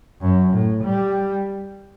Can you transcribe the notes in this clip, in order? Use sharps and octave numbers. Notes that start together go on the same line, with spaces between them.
F#2
A2
G3